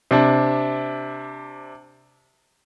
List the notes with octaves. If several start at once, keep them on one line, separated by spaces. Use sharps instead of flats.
C3 D4